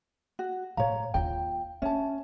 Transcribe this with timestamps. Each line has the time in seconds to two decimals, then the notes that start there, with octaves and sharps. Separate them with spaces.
0.39 F#4
0.77 A2 C#5 F5 A#5
1.14 D#2 F4 G5
1.82 C#4 D4 E5 A5